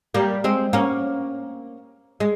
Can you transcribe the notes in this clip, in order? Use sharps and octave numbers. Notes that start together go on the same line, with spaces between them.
G3 A#3
G#3 C4
A#3 C#4
G#3